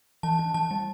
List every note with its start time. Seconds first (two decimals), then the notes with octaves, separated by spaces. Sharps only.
0.23 E3 A5
0.39 E3
0.54 E3 A5
0.71 G3